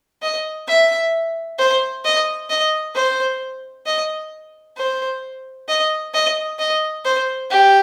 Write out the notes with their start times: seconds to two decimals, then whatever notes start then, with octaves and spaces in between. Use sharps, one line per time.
0.22 D#5
0.68 E5
1.58 C5
2.05 D#5
2.50 D#5
2.95 C5
3.86 D#5
4.77 C5
5.68 D#5
6.14 D#5
6.59 D#5
7.05 C5
7.50 G4